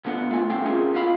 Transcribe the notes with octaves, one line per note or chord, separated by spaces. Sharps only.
A#2 D3 A#3 B3
A#2 A3 F4 G#5
C2 D3 A3 C4 F5 G5
C#4 F4 G#4 A#4
F#2 C#4 F4 F5 B5